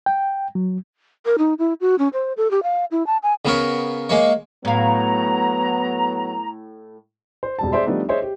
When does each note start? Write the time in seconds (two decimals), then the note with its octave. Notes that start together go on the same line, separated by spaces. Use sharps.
0.06 G5
0.55 F#3
1.26 A#4
1.38 D#4
1.59 E4
1.81 F#4
1.99 C#4
2.13 C5
2.37 A4
2.51 G4
2.63 F5
2.91 E4
3.07 A5
3.23 G#5
3.45 C#3 B3 A#4 C#5
4.09 G#3 A#3 C#5
4.65 A2 F#3 B3 F5 A#5
7.43 C5
7.59 E1 G3 A5
7.72 G#4 C5 D5 E5 C6
7.86 F3 G3 A3 B3 D4 D#4
8.09 G#4 C5 C#5 D#5 E5
8.22 G4